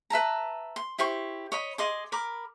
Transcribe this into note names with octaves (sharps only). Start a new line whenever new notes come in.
B4 E5 A5 A#5
C6
E4 G4 C5 C#6
C#5 D#5 B5
G#4 D#5 C6 D6
A#4 B5 D6